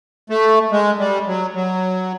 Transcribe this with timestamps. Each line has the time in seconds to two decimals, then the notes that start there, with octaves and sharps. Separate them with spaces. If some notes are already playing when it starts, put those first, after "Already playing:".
0.30 A3
0.71 G#3
0.99 G3
1.27 F#3
1.54 F#3